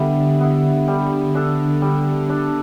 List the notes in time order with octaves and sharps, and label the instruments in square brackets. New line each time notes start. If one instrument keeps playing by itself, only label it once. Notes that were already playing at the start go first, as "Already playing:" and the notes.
Already playing: [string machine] D3 [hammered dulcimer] G3 B3 E4
[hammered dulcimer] B3 E4
G3
D4 A4
G3
D4 A4